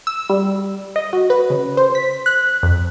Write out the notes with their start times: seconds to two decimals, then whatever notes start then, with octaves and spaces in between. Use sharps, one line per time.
0.07 E6
0.30 G3
0.96 D#5
1.13 F#4
1.30 B4
1.50 C#3
1.77 C5
1.95 B6
2.26 F#6
2.63 F2